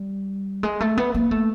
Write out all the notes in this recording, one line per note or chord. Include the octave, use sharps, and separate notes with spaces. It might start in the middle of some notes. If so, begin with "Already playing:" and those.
Already playing: G3
G#3
A3
B3
A#3
A3